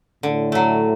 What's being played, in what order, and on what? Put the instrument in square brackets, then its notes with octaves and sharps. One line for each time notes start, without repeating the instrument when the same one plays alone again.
[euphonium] A2 [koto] D3
[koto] F#3 A3